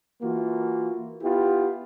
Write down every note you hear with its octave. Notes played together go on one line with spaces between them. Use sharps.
E3 A#3 F4 F#4
B3 E4 F4 G4